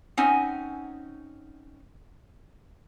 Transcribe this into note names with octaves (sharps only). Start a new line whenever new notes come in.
C4 C#4 D#4 F#5 G#5